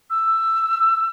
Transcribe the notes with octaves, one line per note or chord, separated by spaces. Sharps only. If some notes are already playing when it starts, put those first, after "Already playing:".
E6